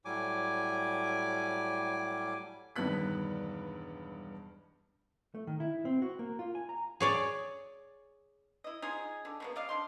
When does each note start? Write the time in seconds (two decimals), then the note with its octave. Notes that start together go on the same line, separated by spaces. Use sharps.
0.05 A2 F#3 G3 G#5 D6
2.76 E1 G2 D#3 B3 F#6 B6
5.35 A3
5.47 D#3
5.60 E4
5.85 C4
6.02 F#4
6.19 A#3
6.39 F4
6.55 G#5
6.69 A#5
7.00 G#4 C#5 D5
8.64 E4 D#5
8.82 D#4 F4 G#4
9.25 D3
9.40 C#3 A#3 B3
9.56 D5 D#5 F5
9.69 D4 D#4 C6